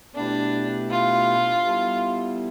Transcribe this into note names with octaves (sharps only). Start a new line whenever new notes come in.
B2 A3 D4 E4 G4 B4
F4
G3 B3 E4 A4